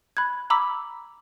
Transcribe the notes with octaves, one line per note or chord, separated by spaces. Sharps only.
B5 F#6 G#6
A#5 B5 D6 E6 B6